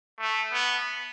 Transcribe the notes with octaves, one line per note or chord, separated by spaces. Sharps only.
A3
B3